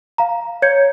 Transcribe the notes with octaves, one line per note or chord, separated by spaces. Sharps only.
F5 A#5
C#5 G6 G#6 C#7